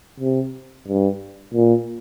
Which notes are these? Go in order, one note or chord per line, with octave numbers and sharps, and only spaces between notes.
C3
G2
A#2